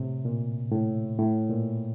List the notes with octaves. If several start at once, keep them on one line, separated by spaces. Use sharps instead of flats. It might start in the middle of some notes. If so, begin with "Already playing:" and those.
Already playing: A2 C3
A#2
A2
A2
A#2